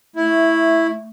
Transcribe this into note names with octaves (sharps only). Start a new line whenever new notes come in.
A3 E4